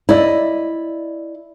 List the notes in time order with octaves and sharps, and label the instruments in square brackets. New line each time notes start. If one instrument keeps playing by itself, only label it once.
[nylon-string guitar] E4 D5 D#5